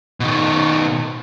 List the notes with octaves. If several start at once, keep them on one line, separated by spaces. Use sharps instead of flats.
B2 D#3